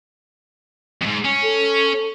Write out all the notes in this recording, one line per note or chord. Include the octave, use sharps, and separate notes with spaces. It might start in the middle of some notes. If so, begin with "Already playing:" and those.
F2 G#2
C#4
A4